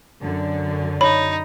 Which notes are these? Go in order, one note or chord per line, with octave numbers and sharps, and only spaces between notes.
F#2 D3
D#4 C#5 B5